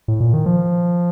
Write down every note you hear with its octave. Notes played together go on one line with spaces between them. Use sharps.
A2
A#2
D#3
F3